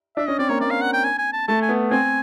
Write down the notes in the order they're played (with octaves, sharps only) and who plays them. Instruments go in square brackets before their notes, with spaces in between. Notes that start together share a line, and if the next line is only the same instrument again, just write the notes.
[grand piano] D4 [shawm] E5
[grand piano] C#4 [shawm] D#5
[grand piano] C4 [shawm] D5
[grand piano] A#3 [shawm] C#5
[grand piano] A#3 [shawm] D5
[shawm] F5
F#5
G5
G#5
G#5
A5
[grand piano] A3 [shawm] A5
[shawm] G#5
[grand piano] B3
[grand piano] C4 [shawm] G#5